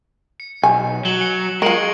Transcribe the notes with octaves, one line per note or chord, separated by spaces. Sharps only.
C#7
B1 G#5
F#3 E7 F#7 G7
C#7
G#3 F4 A#4 C#6 D7 F#7